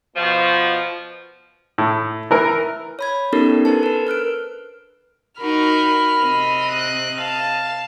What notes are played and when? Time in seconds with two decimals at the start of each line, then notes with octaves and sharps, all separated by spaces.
0.16 B2 F3
1.78 A2
2.31 E3 A#4
2.99 C#5 B5 G#6
3.33 B3 C#4 D#4 G4 A4 A#4
3.65 D4 A4 B4 C5 A5
3.83 A#4 B4
4.07 A#4 F6 F#6 D7
5.41 D#4 F#4 A#4 B5 F6
6.19 C3 C4 D#5
6.70 F#6
7.17 F5 A5